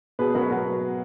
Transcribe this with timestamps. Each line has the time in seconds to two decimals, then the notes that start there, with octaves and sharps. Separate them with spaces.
0.19 B2 G#4 B4
0.35 F#3 F#4 A#4
0.43 B4
0.50 B2 F#4 A#4